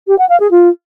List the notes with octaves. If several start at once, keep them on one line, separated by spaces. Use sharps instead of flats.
G4
F#5
F5
G#4
F4